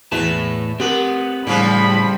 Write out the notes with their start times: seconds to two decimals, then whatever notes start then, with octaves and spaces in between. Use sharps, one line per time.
0.12 E2 A2 B4 E5 A5
0.80 B3 C4 G4 A#4 F#5
1.47 A2 C#3 E3 F3 G3 B5